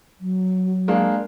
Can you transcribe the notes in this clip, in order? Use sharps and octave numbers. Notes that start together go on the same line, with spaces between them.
F#3
G#3 A#3 D4